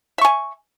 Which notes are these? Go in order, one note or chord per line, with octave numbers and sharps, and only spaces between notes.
E5 G#5 C#6